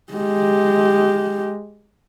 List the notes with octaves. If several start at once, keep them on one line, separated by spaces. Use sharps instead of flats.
G#3 G4